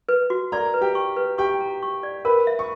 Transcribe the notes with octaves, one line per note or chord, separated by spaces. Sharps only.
B4
F#4
A#4 D5 A#5
B4
G4 G5
C#6
B4
G4 G5 C#6
A#5
C#6
D5
A#4 B4 B5
E5
C#6